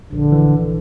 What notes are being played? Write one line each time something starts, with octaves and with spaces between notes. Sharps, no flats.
A#1 D3
E3